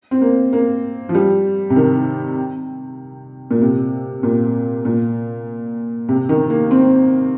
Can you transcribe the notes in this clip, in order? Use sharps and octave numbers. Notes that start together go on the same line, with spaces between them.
C4
A#3
A#3
F3
G3
C3
D#3
A#2
C3
A#2
A#2
C3
D#3
A#3
C4